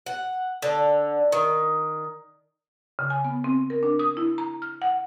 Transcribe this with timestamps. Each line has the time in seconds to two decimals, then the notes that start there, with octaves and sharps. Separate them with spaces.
0.06 F#5
0.62 D3
1.32 D#3
2.99 C#3
3.10 G#5
3.25 B3
3.44 C4
3.70 A#4
3.83 D4
3.99 D#6
4.17 E4
4.38 A#5
4.62 F6
4.82 F#5